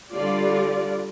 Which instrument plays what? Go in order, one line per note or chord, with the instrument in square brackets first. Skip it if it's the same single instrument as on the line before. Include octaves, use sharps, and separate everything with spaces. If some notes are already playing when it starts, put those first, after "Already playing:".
[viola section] D3 G3 F4 D5